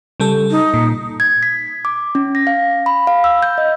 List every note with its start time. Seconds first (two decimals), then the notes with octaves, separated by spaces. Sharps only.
0.20 C#3 G3 A4
0.51 D#4
0.74 A#2
1.20 G#6
1.43 B6
1.85 D6
2.15 C#4
2.35 A#6
2.47 F5
2.86 B5
3.07 F5
3.24 E6
3.42 G6
3.58 D#5